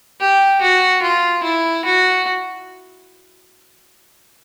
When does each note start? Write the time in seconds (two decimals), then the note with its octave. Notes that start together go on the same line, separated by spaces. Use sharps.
0.20 G4
0.61 F#4
1.02 F4
1.43 E4
1.85 F#4